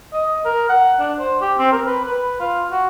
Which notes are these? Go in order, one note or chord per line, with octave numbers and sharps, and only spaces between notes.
D#5
A#4
F#5
D4
C5
G4
C4
A#4
B4
B4
F4
F#4